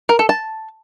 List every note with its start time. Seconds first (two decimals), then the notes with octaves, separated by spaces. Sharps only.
0.09 A#4
0.19 A4
0.29 A5